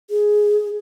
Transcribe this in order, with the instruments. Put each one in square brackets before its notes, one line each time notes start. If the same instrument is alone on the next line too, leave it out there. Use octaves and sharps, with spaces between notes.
[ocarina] G#4